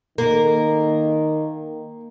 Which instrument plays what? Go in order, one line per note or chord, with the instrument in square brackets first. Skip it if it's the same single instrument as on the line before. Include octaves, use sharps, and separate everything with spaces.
[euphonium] D#3 [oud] A#3